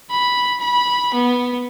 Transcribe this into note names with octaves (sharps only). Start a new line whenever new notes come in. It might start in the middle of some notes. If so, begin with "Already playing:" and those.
B5
B5
B3